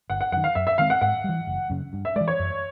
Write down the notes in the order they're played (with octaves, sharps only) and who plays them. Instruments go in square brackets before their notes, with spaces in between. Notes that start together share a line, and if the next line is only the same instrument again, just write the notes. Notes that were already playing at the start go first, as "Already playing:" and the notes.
[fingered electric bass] G1 [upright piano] F#5
[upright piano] F#5
[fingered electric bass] F#2 [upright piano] F#5
[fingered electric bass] D#3
[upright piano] F5
[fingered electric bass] F#2 [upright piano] E5
[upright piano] E5
[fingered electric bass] D#3 G#3 C4 [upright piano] F5
[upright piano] F#5
[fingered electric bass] G#2 [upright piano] F#5
[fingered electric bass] E3 G3
F#1
F#2 C#3
G2
[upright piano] E5
[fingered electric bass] G#3 [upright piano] D5
[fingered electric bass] E3
[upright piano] C#5
[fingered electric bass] F#2